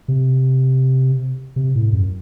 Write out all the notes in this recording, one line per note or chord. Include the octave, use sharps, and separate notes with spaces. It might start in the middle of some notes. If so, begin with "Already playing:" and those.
C3
C3
A2
F#2